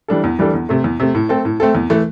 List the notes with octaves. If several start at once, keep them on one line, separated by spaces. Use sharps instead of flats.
E3 G3 D4 A4
E2
E3 G3 D4 A4
E2
C3 A3
E2
C3 A3
A2
A3 C4 A4
A2
A3 C4 A4
E2
E3 A3